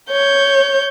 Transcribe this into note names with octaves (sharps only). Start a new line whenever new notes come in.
C#5 G6